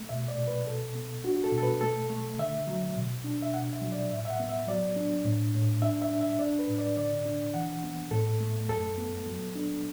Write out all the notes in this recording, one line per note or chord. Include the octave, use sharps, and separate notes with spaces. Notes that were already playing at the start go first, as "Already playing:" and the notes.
Already playing: A3
B2 E5
D5
B2
B4
B2 A4
B3
D4 F#4
F#4
A4
B2
A4
B4
A3 A4
A3
D3 E5
F#3
B2
D4
E5
B2 F#5
E5
F#3
D5
A2 E5
E5
F#5
B3
E5
F#3 D5
D4
A2
A2
D4 E5
E5
D4
E5
D4 D5
B4
A2
D5
D3 D5
D4
E3 F#5
B3
A2 A4
A3
F#2 A4
B3
F#3
D4